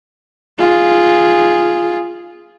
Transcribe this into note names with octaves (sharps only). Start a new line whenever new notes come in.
F4 G#4